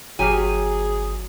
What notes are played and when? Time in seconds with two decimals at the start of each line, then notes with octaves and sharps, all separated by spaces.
0.19 G1 F#3 G4 G#4 F5 G#5